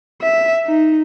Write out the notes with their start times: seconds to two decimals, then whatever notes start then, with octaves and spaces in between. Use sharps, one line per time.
0.22 E5
0.67 D#4